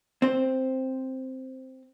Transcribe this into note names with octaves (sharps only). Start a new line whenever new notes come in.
C4 C5